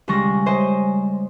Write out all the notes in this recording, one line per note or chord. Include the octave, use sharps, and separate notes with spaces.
C#2 G3 G#3 C#6 A#6
C5 C#5 D#5 G#5